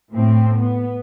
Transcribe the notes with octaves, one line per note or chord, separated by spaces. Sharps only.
A2 C4
B3